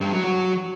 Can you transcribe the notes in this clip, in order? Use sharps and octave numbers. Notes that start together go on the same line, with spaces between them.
G2
F#3
F#3